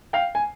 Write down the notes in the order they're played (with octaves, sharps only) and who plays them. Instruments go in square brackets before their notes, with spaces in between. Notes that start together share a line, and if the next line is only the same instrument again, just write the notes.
[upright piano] F5 G5
G#5